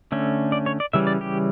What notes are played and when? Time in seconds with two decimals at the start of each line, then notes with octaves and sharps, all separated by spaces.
0.12 D3 A3 C#4
0.52 D5
0.66 C#5
0.80 D5
0.93 C#3 E3 G3 C#4 E5
1.07 D5
1.21 G4